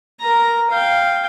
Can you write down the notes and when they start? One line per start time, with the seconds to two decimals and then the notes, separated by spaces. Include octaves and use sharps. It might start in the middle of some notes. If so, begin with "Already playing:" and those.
0.21 A#4 A#5
0.71 F5 G5